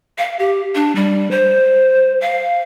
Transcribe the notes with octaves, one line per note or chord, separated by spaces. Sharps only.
F5
G4
D4
G3
C5
F5